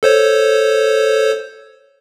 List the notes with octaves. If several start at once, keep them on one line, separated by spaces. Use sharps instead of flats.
A4 C5 C#5